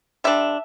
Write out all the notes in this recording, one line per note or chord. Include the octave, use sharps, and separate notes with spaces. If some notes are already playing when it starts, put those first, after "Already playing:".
D3 G3 D4 E5